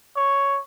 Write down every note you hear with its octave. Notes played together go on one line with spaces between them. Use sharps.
C#5